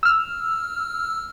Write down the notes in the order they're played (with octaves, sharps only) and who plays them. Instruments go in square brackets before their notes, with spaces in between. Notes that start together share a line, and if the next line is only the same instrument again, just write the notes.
[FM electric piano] E6 F6